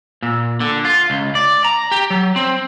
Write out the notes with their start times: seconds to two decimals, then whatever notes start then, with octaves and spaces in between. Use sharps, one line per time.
0.23 A#2
0.60 D3
0.85 F4
1.10 C#2
1.35 D5
1.64 A#5
1.91 G4
2.10 F#3
2.36 C4